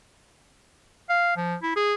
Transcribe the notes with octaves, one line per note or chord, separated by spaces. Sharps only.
F5
F3
E4
G#4